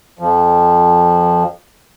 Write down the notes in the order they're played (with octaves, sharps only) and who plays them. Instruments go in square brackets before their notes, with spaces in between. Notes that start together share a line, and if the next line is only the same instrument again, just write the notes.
[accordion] F2 F3